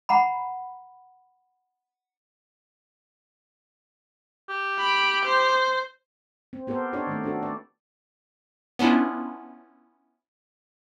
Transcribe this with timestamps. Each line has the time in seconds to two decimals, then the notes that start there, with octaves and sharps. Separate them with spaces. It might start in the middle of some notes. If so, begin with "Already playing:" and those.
0.09 F#5 A#5 B5
4.49 G4
4.80 B5 D7
5.25 C5
6.53 C4
6.67 B3 G4 A4 A#4 C5
6.93 D4 D#4 G4 A4 C#5 D5
7.07 D#3 A3 C4
7.24 D4 F#4 A4
7.43 B4 D5
8.79 B3 C#4 D4 E4 F4